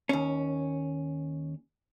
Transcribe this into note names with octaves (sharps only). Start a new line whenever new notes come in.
D#2 C#4